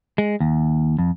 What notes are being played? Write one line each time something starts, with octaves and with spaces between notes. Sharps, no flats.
G#3
D#2
F2